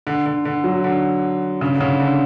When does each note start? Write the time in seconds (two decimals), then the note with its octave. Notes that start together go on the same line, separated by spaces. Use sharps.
0.07 D3
0.26 D3
0.45 D3
0.64 F#3
0.84 D3
1.61 C#3
1.75 D3
1.81 C#3
2.00 D3